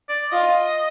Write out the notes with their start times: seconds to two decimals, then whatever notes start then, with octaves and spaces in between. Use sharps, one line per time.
0.09 D5
0.32 F4 D#5